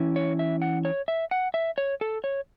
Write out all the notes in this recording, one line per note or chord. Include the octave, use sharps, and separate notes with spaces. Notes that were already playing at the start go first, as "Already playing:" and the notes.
Already playing: E3 C#4 E4
C#5
E5
F#5
C#5
E5
F#5
E5
C#5
A4
C#5